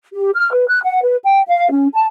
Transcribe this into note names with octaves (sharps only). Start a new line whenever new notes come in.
G4
F6
B4
F#6
F#5
B4
G5
F5
C#4
A5